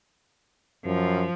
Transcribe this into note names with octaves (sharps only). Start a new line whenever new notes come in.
F#2 F3